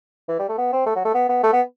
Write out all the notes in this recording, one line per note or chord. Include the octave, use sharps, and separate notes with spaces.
E3
G3
A3
B3
C4
A3
F#3
A3
B3
B3
A3
B3